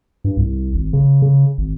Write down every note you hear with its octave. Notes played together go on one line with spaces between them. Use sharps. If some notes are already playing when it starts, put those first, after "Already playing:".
G2
C2
G#1
C#3
C#3
G#1